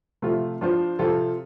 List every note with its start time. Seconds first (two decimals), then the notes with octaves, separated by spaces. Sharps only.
0.22 C3 F3 A3 F4
0.61 F3 D4 F4 C5
0.99 C3 F3 C4 F4 A4